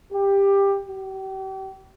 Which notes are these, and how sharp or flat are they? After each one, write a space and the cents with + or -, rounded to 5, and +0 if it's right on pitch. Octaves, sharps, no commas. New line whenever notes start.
G4 +15
G4 -40